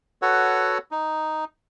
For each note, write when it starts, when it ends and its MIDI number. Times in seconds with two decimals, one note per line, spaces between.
0.22 0.78 66
0.22 0.78 69
0.22 0.78 71
0.22 0.78 73
0.22 0.78 78
0.91 1.45 63